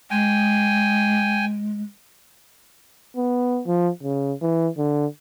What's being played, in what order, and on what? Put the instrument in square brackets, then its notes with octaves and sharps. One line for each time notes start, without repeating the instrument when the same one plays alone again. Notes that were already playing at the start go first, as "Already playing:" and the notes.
[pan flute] G#3 [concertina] G5 G#5
[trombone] B3
F3
C#3
E3
D3